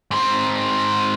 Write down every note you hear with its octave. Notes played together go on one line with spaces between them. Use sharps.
G#2 C4